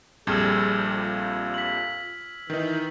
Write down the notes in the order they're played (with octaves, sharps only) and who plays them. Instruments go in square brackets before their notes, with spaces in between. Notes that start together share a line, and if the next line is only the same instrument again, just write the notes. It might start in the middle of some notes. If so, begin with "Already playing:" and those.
[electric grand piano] A#1 F2 G3 [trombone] G#4 [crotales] E6 F6 G#6
[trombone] F4
[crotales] B6 F#7
[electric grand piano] D#3 D#4 [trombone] E3